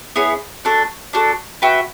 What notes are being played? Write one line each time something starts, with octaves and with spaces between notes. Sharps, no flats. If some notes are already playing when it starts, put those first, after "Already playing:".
B3 E4 G#4 C#5
D4 F#4 A4
D4 F#4 A4
F#4 B4 E5 G5